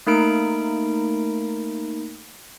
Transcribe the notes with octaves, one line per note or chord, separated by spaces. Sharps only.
A3 A#3 D#4 A#4 B5 D7